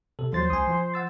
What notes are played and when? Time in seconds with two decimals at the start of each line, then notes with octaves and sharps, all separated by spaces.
0.19 C3 A4
0.32 D#2 F3 F#3 C5 A6
0.50 C#2 G#5 D#6
0.67 F3
0.94 F#5 E6 A6